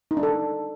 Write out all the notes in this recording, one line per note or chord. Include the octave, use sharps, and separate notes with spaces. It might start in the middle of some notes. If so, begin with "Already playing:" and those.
D#4
D4
A4